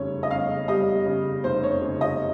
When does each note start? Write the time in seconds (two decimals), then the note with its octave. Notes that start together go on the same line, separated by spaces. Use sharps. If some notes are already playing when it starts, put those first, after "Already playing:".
Already playing: F1 C#3 G3 C#5
0.23 D#5
0.30 C#3 F5
0.68 G3 D#5
1.06 C#3
1.44 F1 C5
1.63 C#5
1.82 C#3
2.01 D#5